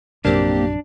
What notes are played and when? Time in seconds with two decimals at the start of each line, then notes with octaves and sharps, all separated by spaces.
0.25 A#1 F#2 C3 A#3 C4 D4 G4